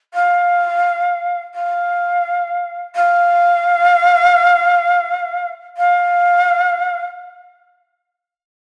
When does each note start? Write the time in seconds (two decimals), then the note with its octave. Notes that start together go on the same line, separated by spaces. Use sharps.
0.14 F5
1.54 F5
2.95 F5
5.77 F5